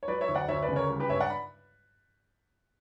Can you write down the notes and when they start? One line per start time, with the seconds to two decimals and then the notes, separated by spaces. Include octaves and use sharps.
0.03 C#5
0.08 F#3 B4 D5
0.21 C#5 E5
0.28 D2
0.35 D5 F#5
0.48 D2 C#5 E5
0.62 B4 D5
0.68 C#3
0.76 A#4 C#5
0.89 G3
1.00 G4 B4
1.09 G2 C#5 E5
1.20 D5 F#5
1.30 B5